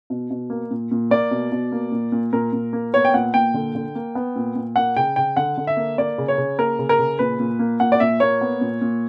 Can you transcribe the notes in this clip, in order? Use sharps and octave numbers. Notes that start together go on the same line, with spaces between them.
B2
B2
A#3
A#2
A#2
A#3 D5
B2
B2
A#3
A#2
A#2
A#2 A#4
A#2
A#3
B3 C#5
G5
A#2 F#5
A#2 G5
D3
D3
A#3
B3
A#2
A#2
A#3 F#5
C#3 G5
C#3 G5
D3 F#5
D3
E5
A#3
A#3 D5
C#3
C#5
C#3
A#3 A#4
C#3
A#4
C#3
A#2 B4
A#2
A#3
A#2 F#5
D5
A#2 E5
A#3 C#5
B3
A#2
A#2